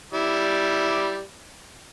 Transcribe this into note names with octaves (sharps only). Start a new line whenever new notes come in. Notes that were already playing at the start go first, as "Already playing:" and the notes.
G3 E4 D6